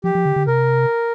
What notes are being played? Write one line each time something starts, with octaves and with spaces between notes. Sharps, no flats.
F3 G4
F3
D3
D3
C3 A#4